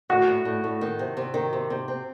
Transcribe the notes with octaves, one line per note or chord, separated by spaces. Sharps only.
A2 F#4
A2
A2
A2
D#3
C3
C3
D#3
C3
C3
C4